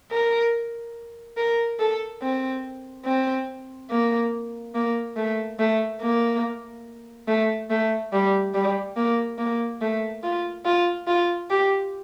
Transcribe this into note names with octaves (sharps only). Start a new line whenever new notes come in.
A#4
A#4
A4
C4
C4
A#3
A#3
A3
A3
A#3
A3
A3
G3
G3
A#3
A#3
A3
F4
F4
F4
G4